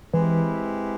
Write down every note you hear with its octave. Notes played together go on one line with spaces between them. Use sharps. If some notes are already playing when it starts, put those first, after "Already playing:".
E3 G#3 C4 E4 G4 B4